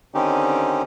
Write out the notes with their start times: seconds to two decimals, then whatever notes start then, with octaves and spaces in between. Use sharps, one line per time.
0.15 D3 D#3 C4 C#4 D#4 G4